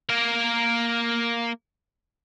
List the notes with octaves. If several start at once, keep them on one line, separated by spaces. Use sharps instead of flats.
A#3 A#4